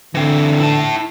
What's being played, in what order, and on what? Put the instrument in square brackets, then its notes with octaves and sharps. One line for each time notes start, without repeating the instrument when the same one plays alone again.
[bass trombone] D3 [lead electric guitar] E3 C4
[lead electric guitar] E4 A5